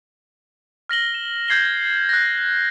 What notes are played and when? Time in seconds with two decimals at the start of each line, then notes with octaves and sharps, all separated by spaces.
0.89 F6 A#6 F#7 G7
1.14 E7
1.48 F6 G6 G#6 C7 F#7 G7
2.09 F#6 A#6